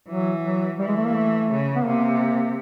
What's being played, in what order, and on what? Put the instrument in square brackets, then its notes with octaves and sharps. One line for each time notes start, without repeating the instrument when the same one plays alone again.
[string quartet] E3 [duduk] F#3
[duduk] F#3
[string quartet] E3 [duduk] G3
[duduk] G#3
A3
A#3
A3
[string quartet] C#3
[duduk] B3
[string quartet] C3 [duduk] A#3